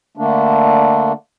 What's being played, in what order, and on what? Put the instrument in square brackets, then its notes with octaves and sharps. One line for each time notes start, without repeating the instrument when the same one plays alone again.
[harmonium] D3 A3 A#3 D4